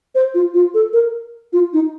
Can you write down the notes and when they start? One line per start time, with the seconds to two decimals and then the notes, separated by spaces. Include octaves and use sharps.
0.15 C5
0.34 F4
0.54 F4
0.74 A4
0.93 A#4
1.53 F4
1.73 D#4